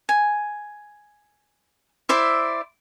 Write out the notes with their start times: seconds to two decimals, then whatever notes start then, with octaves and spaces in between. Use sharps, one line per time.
0.09 G#5
2.09 E4 C5 D5 E5